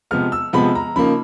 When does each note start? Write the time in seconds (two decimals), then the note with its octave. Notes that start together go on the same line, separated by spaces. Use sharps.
0.11 C3 F3 G#3 B3 F6
0.32 E6
0.53 C3 F3 G#3 B3 B5
0.75 A#5
0.96 C#3 F3 A#3 D#4 B5